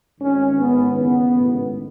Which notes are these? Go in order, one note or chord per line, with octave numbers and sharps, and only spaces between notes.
G#1 G#2 D#3 C#4
G#1 G#2 D#3 B3
F#1 E2 C#3 B3
A1 G#2 D#3